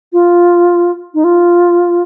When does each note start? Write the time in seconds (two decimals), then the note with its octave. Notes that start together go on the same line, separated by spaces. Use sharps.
0.13 F4
1.14 D#4
1.24 F4